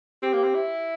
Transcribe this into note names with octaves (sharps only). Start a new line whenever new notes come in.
C4 G4
A#3
C4
E4